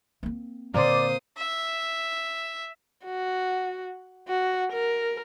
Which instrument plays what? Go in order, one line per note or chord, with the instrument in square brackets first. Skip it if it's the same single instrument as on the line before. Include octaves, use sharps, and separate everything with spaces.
[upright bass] A#3 C4
[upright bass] A#2 D3 [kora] A#3 C4 [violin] C5 D#6 [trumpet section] D5
[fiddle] E5
[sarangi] F#4
F#4
A#4